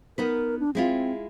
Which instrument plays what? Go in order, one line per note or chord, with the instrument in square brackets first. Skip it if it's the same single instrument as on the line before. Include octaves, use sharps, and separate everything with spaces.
[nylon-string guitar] B3 D#4 B4 [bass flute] A#4
[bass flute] D4
[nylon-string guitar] G#3 E4 F4 [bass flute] C4